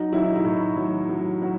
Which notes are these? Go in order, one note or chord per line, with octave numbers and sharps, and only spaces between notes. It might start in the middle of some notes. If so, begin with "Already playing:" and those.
Already playing: F#3 D#4
F#3 E4
D#4
E4
A2
F#3
F#3
F#3